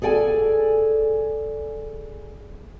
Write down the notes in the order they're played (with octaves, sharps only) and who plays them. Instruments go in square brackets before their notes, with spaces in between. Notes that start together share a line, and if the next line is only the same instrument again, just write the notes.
[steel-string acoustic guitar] G#4 A4 D5 G5 G#5